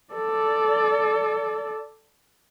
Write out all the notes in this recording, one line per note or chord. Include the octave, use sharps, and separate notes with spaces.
A4 D5